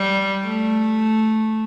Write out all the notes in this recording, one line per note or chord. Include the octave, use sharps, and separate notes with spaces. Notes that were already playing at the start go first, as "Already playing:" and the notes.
Already playing: G3
A3